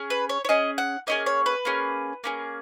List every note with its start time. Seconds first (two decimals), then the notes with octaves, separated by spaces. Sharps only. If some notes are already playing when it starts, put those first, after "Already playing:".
Already playing: C#4 G#4
0.10 B4
0.29 C#5
0.45 C#5
0.49 C#4 G#4 D#5
0.78 F#5
1.07 A#3 C#4 G#4 D#5
1.26 C#5
1.46 B4
1.65 A#3 C#4 G#4
2.24 A#3 C#4 G#4